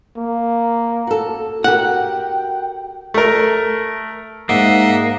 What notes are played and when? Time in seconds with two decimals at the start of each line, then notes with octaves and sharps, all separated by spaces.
0.17 A#3
1.07 F#4 A4
1.64 F#4 G4 A#4 F#5 G5
3.14 A3 A#4
4.49 G#2 A#3 D#5 E5 F#5